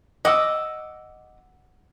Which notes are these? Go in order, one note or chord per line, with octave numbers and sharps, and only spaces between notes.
D#5 F#5 D6 E6